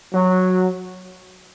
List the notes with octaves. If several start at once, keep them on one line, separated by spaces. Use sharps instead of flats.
F#3